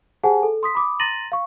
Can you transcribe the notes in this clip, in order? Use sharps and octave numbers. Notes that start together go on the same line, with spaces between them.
G4 G#4 C5 F#5 G#5 A5
A4
C6 D#6 B6
B5 D6 D#6
A#5 C6 A6 A#6 D#7 F#7
F5 C#6